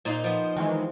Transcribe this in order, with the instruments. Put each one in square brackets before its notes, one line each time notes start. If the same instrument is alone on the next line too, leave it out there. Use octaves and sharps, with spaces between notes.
[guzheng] A#2 D#4 F4 [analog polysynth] C5 G6
[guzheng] F3 B3
[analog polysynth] D#3 E3 G#3 [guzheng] C4